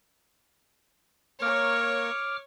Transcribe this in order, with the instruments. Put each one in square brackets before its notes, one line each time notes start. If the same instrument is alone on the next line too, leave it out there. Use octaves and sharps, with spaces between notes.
[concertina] A#3 A#4 [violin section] C#5 [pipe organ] D6 F6